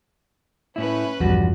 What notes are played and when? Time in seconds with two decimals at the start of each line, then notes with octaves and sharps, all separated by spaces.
0.76 A2 C#4 E4 B4
1.20 B1 E2 G2 F3 G3 F#4